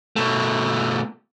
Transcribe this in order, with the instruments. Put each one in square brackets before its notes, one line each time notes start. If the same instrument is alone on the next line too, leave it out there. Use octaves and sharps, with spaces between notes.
[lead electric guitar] B2 A3